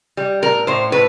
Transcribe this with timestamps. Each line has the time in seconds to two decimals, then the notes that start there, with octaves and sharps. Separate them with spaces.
0.17 G3
0.42 A2 A#4
0.67 A2 C5
0.92 A2 B4